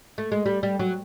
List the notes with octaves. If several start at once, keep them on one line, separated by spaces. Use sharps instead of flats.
A3
G#3
G3
G3
F#3